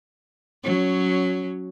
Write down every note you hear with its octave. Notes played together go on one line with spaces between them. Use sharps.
F#3 C#4